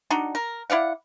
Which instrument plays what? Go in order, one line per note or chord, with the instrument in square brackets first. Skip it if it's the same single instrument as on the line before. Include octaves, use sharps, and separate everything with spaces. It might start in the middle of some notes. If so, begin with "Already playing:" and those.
[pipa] D4 D#4 F#4
A#4
E4 D5 F5 F#5